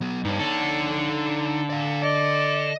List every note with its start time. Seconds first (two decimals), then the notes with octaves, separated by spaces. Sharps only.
0.01 F#3 B3
0.25 G2 D#4 C#5
0.39 D3 A4
1.70 D5 F5
2.03 D5 D#5